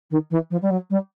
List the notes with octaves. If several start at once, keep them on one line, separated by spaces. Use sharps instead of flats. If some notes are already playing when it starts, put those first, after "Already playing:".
D#3
E3
F3
G3
F#3
G3